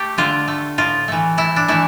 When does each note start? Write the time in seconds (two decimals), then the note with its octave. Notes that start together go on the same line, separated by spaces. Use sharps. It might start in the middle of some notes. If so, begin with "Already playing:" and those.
Already playing: A3 G4
0.18 D3 F4
0.48 A3
0.78 A2 F4
1.08 E3 A3
1.37 A2 E4
1.56 D4
1.68 E3 A3 E4